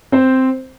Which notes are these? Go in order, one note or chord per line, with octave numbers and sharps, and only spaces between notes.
C4 C5